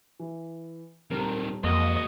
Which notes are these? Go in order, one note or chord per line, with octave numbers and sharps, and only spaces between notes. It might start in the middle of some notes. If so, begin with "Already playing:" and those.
E3
D#1 C3 D#3 A#4
F2 G#3 A#3 F#4 D#5